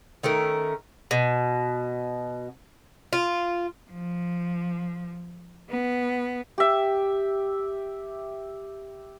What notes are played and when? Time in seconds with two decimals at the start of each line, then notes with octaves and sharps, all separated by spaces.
0.23 D#3 A3 C#4 A#4
1.11 B2
3.13 F4
3.90 F3
5.69 B3
6.58 G4 E5